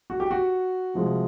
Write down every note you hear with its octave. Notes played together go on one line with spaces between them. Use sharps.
F#4
G4
F#4
C2 C3 F3 G#3